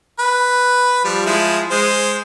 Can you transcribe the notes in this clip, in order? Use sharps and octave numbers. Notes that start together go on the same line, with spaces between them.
B4
F3 G3
F3 G#3 E4
G#3 C5